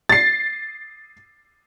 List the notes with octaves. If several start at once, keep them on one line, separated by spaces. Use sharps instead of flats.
A6 C7